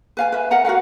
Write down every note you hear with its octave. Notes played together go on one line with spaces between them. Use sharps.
B4 F5 G#5
B4 E5
A#4 E5 F#5 A#5
F#4 A#4 F5 F#5